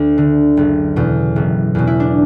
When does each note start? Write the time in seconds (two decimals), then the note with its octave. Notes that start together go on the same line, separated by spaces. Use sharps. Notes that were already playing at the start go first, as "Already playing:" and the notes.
Already playing: D2
0.18 D3
0.57 F#1
0.96 E2 B2
1.36 F#1
1.75 E2 B2
1.87 E4
2.00 D4